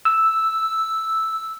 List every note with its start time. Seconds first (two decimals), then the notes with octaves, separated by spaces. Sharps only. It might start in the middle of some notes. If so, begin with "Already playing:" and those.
0.05 E6